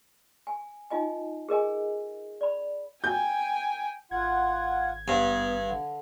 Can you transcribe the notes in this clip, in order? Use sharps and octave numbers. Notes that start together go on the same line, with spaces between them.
G#5
D#4 F4 D#5 G#5
G#4 A#4 D#5 G#5
D5 B5
G5 G#5 G6
G#1 F4 F#5 G#6
G2 B3
D3